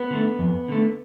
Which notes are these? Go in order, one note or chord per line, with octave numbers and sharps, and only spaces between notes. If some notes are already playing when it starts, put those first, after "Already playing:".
Already playing: B3
D3 A3
F2
D3 A3